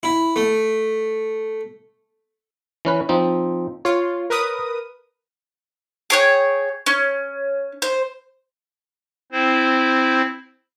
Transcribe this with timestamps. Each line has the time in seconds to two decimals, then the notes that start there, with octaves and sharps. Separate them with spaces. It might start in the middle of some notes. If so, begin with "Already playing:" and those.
0.03 E4
0.36 A3
2.85 E3 C#4 B4
3.09 F3 C4 D#4
3.85 F4 C#5
4.30 A#4 B4 D#6
6.10 G#4 C#5 G5
6.86 C#4
7.82 C5
9.32 C4 E4 C5